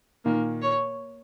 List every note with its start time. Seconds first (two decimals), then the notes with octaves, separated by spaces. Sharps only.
0.25 A#2 D#3 A#3
0.62 C#5